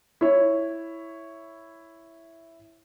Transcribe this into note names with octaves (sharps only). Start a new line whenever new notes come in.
E4 C#5